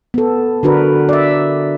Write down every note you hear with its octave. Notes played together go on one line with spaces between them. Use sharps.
B3 A4
D3 D4 F#4 A#4 B4
D5 E5